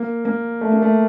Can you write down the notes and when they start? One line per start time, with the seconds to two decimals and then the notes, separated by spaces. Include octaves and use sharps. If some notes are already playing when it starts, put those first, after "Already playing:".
Already playing: A#3
0.25 A#3
0.61 A3
0.72 A#3
0.82 A3